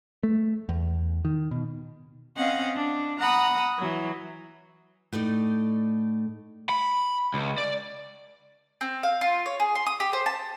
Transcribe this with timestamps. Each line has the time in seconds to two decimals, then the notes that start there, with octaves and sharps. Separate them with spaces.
0.23 A3
0.69 E2
1.25 D#3
1.51 B2
2.37 C4 C#4 D#5 F5 F#5
2.76 D4
3.19 F#5 A#5 B5 D#6
3.79 E3 F#3
5.12 A2 A3 D#4 D5
6.69 B5
7.34 C#2
7.58 D5
8.81 C4
9.03 F5
9.21 F4
9.46 C#5
9.60 G#4
9.75 C6
9.86 D#6
10.00 G4
10.13 C5
10.26 A5